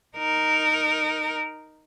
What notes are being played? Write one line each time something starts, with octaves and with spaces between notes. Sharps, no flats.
D#4 A#4